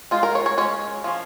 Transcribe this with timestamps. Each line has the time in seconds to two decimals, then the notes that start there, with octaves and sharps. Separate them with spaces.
0.11 G#3 D#4 F4
0.23 A#4
0.35 C#5
0.46 C#5
0.58 G#3 C#4 C#5
1.04 F3 C#4